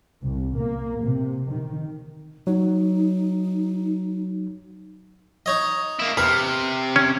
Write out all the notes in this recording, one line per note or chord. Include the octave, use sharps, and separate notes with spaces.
C2
A#3
C3
D#3
F#3 D#4
D#4 C#5 D#5
A#3 E4
C3 B4 F6
C#4